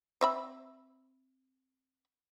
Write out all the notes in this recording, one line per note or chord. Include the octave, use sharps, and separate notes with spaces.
C4 E5 B5